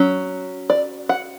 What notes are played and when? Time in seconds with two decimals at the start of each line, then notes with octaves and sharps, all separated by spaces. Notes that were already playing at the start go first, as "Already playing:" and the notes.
Already playing: F#3 C#4
0.70 D5
1.09 F#5